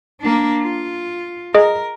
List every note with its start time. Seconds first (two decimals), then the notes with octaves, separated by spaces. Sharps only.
0.20 A#3 D4
0.62 F4
1.54 G#4 A#4 D#5